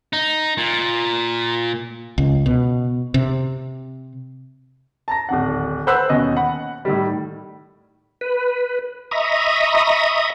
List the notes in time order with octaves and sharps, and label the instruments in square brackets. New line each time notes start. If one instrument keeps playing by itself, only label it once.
[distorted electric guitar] D#4
A#2
[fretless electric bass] C#2
B2
C3
[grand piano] A5 A#5 A#6
D1 G#1 F#5
B4 C5 F#5 B5 E6 F#6
D#2 B2 C#4 D#5
F#5 B5
A2 D#3 G3
[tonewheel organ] B4
D#5 E5 A#5 B5 C#6 D#6